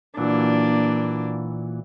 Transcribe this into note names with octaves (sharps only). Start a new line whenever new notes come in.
A#2 E3 F#3 A#3 D4